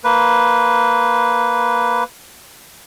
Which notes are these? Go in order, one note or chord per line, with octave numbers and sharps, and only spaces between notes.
A#3 B4